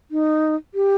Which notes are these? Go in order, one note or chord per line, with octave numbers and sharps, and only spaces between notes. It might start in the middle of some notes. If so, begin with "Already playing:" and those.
D#4
G4